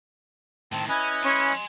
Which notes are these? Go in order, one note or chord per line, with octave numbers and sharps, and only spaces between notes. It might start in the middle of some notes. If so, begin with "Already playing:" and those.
A2 D#3 C4 A5
C#4 E4 B4 D#5 G#5
C#4 G#5 C6